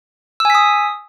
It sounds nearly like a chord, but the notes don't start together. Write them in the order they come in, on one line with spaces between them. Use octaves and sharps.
E6 G#5 B6 D#6